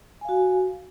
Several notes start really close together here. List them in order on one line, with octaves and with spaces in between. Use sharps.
G#5 F5 F#4